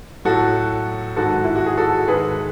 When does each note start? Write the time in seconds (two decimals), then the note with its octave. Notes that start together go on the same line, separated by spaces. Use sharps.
0.25 A2 F#3 F#4 A4
1.16 G#2 D#3 G#3 F#4 A4
1.44 E4
1.56 F#4
1.66 G#4
1.77 F#4 A4
2.08 G#2 D#3 G#3 G#4 B4